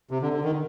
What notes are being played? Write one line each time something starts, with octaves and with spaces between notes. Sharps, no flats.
C3
D3
D3
D#3